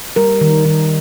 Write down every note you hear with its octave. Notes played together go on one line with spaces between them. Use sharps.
G3 A#4
D#3
D#3